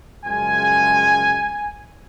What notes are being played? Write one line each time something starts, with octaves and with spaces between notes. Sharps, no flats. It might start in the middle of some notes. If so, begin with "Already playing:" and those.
F#2 C#3 F3 G#3 G#5